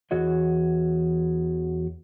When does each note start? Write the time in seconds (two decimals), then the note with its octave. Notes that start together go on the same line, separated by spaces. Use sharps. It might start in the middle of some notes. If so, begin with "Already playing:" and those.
0.11 E2 E3 F#4 G#4 C#5 D#5